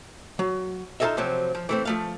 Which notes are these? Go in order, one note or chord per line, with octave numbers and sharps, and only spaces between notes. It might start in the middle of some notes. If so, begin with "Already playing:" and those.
F#3
D#4 F4 G#4 A4 D#5 E5
C3 F3 F#3 C4
F3
E3 A3 C4
F3 A3 F5